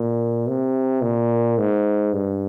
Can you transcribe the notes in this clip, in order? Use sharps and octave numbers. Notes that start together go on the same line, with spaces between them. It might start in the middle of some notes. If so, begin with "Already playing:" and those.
Already playing: A#2
C3
A#2
G#2
G2